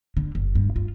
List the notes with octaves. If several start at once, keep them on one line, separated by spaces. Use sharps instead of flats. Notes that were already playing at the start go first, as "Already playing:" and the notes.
D3
F#1
G2
F4